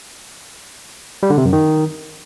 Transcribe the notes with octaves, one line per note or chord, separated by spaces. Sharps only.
G3
D3
C3
F#2
D#3